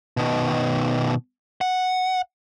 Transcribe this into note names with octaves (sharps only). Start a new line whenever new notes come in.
B2 D#3
F#5